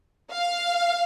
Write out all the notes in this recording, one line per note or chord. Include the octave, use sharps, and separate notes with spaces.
F5